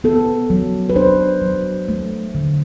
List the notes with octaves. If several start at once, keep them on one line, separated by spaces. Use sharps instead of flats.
B3 A4
F#3
B4
D4 C5
F#3
A3
D3